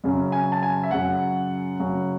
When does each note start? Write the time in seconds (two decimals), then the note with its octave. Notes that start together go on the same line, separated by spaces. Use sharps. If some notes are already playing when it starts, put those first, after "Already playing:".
0.04 F#2 C#3 F#3
0.32 G#5
0.52 A5
0.63 G#5
0.83 E5
0.91 F#2 C#3 F#3 F#5
1.80 F#2 C#3 F#3